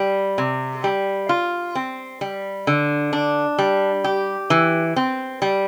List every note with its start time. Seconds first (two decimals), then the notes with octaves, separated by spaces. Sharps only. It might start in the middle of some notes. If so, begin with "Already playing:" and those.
Already playing: G3
0.38 C3
0.84 G3
1.29 F4
1.75 C4
2.21 G3
2.67 D3
3.13 D4
3.59 G3
4.04 G4
4.50 E3
4.96 C4
5.42 G3